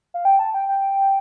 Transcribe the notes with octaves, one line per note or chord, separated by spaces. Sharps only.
F5
G5
A5
G5
G5